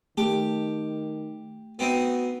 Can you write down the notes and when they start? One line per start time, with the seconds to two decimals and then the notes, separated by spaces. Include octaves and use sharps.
0.17 D#3 A3 G4
1.79 B3 C4 D#4 F#4